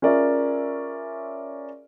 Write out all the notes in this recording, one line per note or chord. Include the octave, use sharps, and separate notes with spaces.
C#4 F4 G#4 A#4 D5 E5